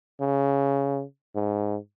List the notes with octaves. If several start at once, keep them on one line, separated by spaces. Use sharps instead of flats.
C#3
G#2